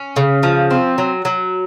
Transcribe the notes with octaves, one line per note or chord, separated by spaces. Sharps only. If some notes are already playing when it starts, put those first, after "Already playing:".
Already playing: C#4
C#3
F3
C4
F#3
F#3